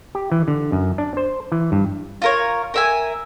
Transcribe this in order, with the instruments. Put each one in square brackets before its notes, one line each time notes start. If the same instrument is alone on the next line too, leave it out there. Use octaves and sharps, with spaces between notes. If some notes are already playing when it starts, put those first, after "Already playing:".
[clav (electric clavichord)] G4
E3
D3
F#2
D4
C5
E3
G2
[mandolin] F4 A#4 C#5
A#4 E5 G#5